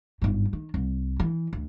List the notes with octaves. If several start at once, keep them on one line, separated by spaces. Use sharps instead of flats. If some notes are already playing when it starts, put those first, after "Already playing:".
G1 G#2
D#3
C2
E3
D2